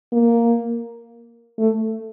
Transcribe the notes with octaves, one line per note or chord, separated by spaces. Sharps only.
A#3
A3